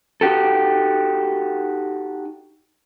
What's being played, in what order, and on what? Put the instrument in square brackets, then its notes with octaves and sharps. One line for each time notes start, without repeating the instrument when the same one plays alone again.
[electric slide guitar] D#4 F#4 G4 A4